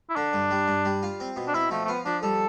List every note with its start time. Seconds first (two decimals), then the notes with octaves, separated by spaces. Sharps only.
0.10 E4
0.16 D3 D4
0.33 G2
0.51 G3
0.68 G2
0.85 G3
1.03 F4
1.20 C4
1.36 B2
1.48 D4
1.54 C4 E4
1.71 F3 A3
1.85 A3
1.88 B3 F4
2.05 F3 D4
2.23 G3 A4